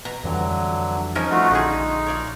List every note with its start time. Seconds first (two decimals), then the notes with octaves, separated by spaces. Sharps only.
0.05 B2 A#5
0.24 F2 D3 E3 F#3 G3
1.15 F3 C#4 D#4 A#4
1.31 A3 F4 F#4
1.51 A#1 D3 G#3 D#4 G#4
2.06 C#5 D5 F5